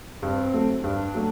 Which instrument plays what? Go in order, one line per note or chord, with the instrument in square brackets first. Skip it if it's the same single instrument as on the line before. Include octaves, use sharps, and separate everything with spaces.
[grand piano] G2 [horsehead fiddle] C4
[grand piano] F#3 A3
[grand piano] G2 [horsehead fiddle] D4
[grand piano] F#3 A3